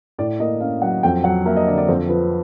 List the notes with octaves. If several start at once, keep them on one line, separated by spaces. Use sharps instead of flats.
A2 D5
A#3 D#5
C#4 F5
F#3 F#5
F2 G5
F#3 F#5
A#3 E5
D#5
D3 D5
D5
F2 C5
F3 B4